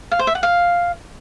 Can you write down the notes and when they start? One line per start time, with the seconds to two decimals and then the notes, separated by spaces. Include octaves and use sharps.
0.12 F5
0.19 C5
0.27 E5
0.35 F#5
0.43 F5